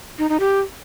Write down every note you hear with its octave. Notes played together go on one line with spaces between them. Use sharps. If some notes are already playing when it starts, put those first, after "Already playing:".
D#4
D#4
G4